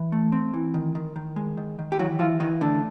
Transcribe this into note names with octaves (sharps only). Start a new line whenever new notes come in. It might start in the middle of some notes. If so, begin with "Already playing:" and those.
Already playing: E3
A3
C4
E3
D#3
D#3
D#3
G#3
D#3
D#3
G4
E3 F#3 F#4
E3 F3 F4
D#3 E3 D#4
D3 A3 D4